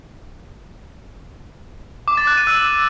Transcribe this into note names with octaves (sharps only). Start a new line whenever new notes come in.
D6
A6
F#6
D#7
E6